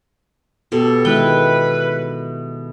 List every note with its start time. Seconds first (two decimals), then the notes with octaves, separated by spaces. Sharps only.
0.72 B2 G4 A4
1.05 D#3 G#3 E4 B4 G5